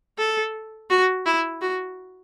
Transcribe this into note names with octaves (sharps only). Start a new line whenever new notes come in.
A4
F#4
E4
F#4